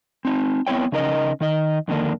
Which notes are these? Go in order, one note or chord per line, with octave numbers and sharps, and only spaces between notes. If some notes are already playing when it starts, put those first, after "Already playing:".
C4 D#4
B3 C4 E4 C#5 G5
C#3 C#4 D#4 A#4 C5 D#5
D#3 D#4 D#5
F2 D3 D#3 A#3 D4